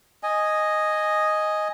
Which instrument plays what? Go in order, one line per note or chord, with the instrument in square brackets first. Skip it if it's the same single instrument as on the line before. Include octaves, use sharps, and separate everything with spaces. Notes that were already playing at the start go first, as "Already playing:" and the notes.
[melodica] D#5 G#5